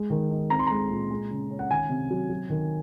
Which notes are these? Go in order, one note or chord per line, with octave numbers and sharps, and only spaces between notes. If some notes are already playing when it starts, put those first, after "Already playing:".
Already playing: G#3
D#3
D#4
C4 A#5
C6
G#3 A#5
A#2
G#3
C#3
C#4
F#5
D#3 G#5
C3
F#3
F#3
D#3